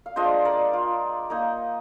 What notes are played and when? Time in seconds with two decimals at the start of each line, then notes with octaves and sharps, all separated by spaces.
0.06 F5
0.16 G#3 D4 F4 C5 D#5
0.45 A#4 D5
0.73 F4
1.30 A#3 D#4